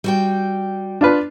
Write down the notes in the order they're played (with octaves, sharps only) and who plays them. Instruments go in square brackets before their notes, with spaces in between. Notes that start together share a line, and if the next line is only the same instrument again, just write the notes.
[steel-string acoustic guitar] G3 F#4 G5
[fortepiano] D4 F4 B4